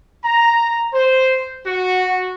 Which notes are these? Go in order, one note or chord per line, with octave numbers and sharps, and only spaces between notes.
A#5
C5
F#4